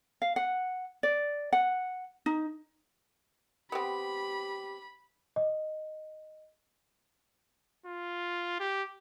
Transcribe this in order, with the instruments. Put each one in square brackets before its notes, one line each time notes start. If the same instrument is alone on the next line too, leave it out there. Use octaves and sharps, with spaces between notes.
[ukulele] F5
F#5
D5
F#5
D#4
[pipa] B3 C4 [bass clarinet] G4 [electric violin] B5
[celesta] D#5
[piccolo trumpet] F4
G4